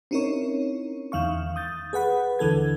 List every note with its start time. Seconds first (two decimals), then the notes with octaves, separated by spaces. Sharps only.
0.11 C4 C#4 D#4 E4 A#4 C#5
1.12 E2 D#3 F5 C#6
1.56 D#6 G6 A6
1.93 G#4 B4 F#5 B5
2.39 D#2 D3 E3 A4 G#6